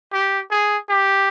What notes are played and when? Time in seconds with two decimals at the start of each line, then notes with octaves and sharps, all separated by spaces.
0.13 G4
0.51 G#4
0.89 G4